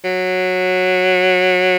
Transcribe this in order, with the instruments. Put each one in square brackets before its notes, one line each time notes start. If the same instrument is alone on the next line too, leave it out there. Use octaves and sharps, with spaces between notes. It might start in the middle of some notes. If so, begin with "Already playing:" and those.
[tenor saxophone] F#3